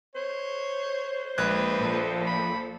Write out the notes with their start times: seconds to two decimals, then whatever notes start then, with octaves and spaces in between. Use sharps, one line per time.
0.15 C5 C#5
1.38 A#1 G#3 A#3 B4 F#6 G#6
1.78 A#2 F3 A4
2.27 B5